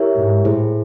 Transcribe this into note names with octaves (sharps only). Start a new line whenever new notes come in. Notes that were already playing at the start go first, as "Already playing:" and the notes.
Already playing: E4 G4 A#4 C#5 E5
G#2
A2 E4 G#4 C5